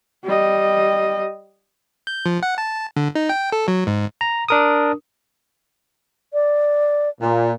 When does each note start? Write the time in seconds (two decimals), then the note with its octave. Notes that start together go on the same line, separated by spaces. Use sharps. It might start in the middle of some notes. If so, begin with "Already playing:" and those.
0.24 G3 D#5
2.07 G6
2.26 F3
2.43 F#5
2.58 A5
2.96 D3
3.15 D#4
3.29 G5
3.52 A4
3.68 F#3
3.87 G#2
4.21 A#5
4.48 D4 A#4 D#6
6.33 D5
7.21 A#2